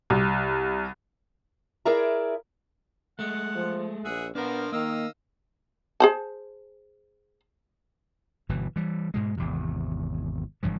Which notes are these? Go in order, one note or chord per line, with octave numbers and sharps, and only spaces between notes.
C2
E4 G#4 A#4 D5 E5 A#5
G#3 A3 F#5
F3
A#1 G#4 E5 F#5
F3 A#3 B3 D4 A#4
D#3 A#3 D#5 F5 E6
G#4 C5 A5
G1 B2 E3
E3 G3
G#2 B2 G#3
G#1 E2 C3
F#1 G2 E3 F3